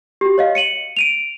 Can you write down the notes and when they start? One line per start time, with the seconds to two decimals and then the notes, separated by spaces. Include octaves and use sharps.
0.21 F#4 G4
0.38 C#5 D#5 F5
0.55 C#7 D#7 F#7
0.97 D7 D#7 F7